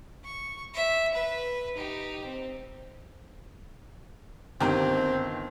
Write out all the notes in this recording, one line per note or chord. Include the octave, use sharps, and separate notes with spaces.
C#6
E5
B4
D#4 G4
C4
G1 D#3 C4 G4 A#4 G5